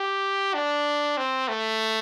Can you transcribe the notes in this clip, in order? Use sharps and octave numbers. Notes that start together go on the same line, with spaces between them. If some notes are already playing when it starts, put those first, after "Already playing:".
Already playing: G4
D4
C4
A3